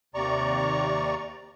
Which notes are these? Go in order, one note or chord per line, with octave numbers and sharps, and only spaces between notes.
D#2 C3 D5 A#5 C#6